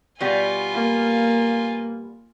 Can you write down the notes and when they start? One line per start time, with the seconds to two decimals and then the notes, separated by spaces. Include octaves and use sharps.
0.20 B2 G3 B3 F4 G#5
0.74 A#3